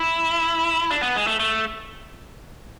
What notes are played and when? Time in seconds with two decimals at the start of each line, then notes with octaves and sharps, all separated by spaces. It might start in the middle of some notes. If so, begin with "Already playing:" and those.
Already playing: E4
0.91 D4
1.02 B3
1.16 G#3
1.27 A3
1.40 A3